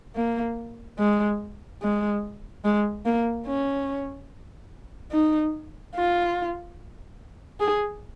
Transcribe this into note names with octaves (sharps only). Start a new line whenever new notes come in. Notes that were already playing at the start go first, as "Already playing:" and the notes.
A#3
G#3
G#3
G#3
A#3
C#4
D#4
F4
G#4